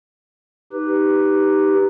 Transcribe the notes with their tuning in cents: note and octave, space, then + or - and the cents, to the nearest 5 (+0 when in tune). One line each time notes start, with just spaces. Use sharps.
D#4 +0 G4 +0 B4 +0